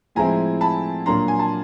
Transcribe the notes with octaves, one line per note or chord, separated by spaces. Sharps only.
A2 F3 G#3 C4 E4 G#5 A#5
A5 B5
A#2 F#3 A#3 D4 A#5 C6
G#5
A5